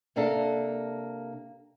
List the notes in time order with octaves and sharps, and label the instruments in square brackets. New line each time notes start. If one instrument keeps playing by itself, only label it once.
[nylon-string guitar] C3 A#3 D4 A4 A#4